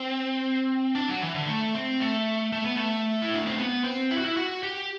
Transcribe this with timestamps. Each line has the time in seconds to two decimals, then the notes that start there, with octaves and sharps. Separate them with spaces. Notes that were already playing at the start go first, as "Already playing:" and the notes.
Already playing: C4
0.95 D4
1.08 F#3
1.21 E3
1.35 D3
1.47 A3
1.74 C4
2.00 A3
2.52 A3
2.64 B3
2.76 A3
3.22 E4
3.34 D4
3.46 C4
3.58 B3
3.84 C4
4.11 E4
4.18 F#4
4.25 E4
4.37 F#4
4.63 G4